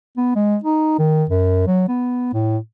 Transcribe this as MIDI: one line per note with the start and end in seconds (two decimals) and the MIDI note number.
0.17 0.34 59
0.36 0.57 56
0.64 0.95 63
0.99 1.24 51
1.30 1.66 42
1.67 1.88 54
1.88 2.31 59
2.33 2.58 45